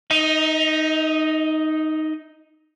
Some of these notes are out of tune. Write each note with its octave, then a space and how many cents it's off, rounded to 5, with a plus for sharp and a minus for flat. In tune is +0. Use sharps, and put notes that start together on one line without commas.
D#4 +0 D#5 +45